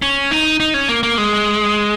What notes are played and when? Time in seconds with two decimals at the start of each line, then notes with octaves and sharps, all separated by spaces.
0.02 C#4
0.31 D#4
0.60 D#4
0.74 C#4
0.89 A#3
1.03 A#3
1.18 G#3